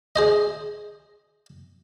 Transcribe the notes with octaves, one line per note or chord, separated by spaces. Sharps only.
G#4 C5 D#5